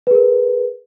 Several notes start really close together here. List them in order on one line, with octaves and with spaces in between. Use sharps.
B4 G#4 A#4